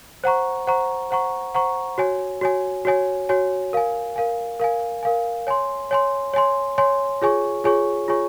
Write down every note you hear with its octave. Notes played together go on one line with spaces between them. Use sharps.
C5 F#5 A#5 C#6
C5 F#5 A#5 C#6
C5 F#5 A#5 C#6
C5 F#5 A#5 C#6
F#4 C#5 G#5
F#4 C#5 G#5
F#4 C#5 G#5
F#4 C#5 G#5
A#4 F5 G#5
A#4 F5 G#5
A#4 F5 G#5
A#4 F5 G#5
C#5 G#5 C6
C#5 G#5 C6
C#5 G#5 C6
C#5 G#5 C6
F4 G#4 C#5 G#5 C#6
F4 G#4 C#5 G#5 C#6
F4 G#4 C#5 G#5 C#6